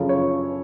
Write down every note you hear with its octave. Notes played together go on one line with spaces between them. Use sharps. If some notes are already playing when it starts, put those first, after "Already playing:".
Already playing: F#2 C#3 F3 A4
C#5